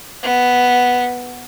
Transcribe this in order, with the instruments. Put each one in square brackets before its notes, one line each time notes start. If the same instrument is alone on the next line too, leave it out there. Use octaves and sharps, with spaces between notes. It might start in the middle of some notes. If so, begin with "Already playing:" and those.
[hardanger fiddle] B3